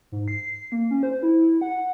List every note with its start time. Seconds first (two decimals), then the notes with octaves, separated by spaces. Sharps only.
0.12 G#2
0.28 C7
0.72 A#3
0.91 C#4
1.03 C5
1.23 E4
1.61 F#5